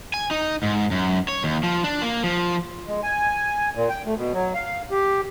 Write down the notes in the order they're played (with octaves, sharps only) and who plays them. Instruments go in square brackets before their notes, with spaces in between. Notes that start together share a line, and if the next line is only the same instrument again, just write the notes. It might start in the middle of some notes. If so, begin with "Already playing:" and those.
[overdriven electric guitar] G#5
D#4
G#2
F#2
C#5
D#2
F3
D4
A#3
F3
[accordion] G#3
G#5
A#2
G5
A3
B2
F#3
F5
G4